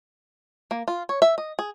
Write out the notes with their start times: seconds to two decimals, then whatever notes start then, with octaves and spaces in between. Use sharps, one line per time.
0.71 A#3
0.88 F4
1.09 C#5
1.22 E5
1.38 D#5
1.59 G#4